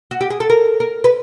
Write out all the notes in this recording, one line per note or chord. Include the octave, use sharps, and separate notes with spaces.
F#4
G4
G#4
A4
A#4
A#4
B4